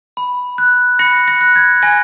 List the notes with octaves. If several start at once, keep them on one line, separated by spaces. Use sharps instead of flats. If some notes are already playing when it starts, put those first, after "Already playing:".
B5
F#6
B5 A#6 C#7
A#6
F#6
G#6
G#5 A#6